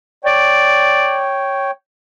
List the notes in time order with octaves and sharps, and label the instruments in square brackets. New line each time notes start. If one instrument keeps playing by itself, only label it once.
[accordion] C#5 G5 [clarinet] D5